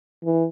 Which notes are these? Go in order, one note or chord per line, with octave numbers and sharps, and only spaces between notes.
E3